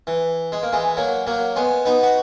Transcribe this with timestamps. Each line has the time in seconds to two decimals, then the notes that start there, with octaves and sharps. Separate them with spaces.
0.07 E3
0.52 G#3
0.63 A#3
0.73 E3 G#3
0.97 F#3 A#3
1.27 F#3 A#3
1.56 G#3 B3
1.85 B3 D#4
2.03 F#4